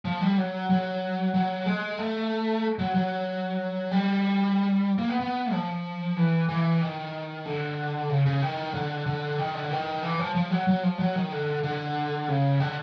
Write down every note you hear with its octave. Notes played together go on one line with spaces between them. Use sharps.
F3
G3
F#3
F#3
F#3
G#3
A3
F#3
F#3
G3
A#3
B3
B3
F3
E3
E3
D#3
D3
C#3
C#3
D#3
D3
D3
D#3
D3
D#3
E3
F3
F3
F#3
F#3
F3
F#3
D#3
D3
D3
C#3
D3